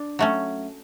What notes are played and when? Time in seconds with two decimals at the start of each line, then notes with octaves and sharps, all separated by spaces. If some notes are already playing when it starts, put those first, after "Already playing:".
Already playing: D4
0.19 F#3 A3 C#4